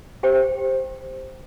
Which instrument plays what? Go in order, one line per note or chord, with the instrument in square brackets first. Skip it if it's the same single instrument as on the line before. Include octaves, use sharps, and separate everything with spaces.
[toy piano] G4 C5 G5